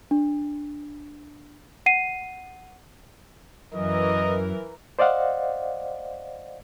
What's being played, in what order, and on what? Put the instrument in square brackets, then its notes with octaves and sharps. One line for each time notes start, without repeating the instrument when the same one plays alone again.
[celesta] D4
F#5 C7 D#7
[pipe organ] F#2 [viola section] E3 A#4 [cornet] D#5
[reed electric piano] C5 D5 D#5 F5 F#5